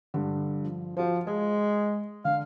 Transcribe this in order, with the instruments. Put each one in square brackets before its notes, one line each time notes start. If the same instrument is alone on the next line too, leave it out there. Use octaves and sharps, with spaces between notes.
[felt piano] G2 D3
[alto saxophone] F3
[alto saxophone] F3 [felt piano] F#4 C5
[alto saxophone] G#3 [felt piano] G#4
[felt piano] D3 [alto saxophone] F5